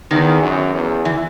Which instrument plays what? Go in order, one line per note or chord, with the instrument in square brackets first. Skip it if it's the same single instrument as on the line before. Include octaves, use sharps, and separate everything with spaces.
[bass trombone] E2 [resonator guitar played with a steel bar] D#3
[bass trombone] F#2
E2
[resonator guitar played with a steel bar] E3